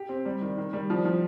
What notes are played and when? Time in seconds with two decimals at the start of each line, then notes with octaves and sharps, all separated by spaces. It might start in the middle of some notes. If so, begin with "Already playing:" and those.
Already playing: G4
0.09 C4
0.25 G3
0.42 D#3
0.58 D#3
0.73 G3
0.90 F3
1.05 F3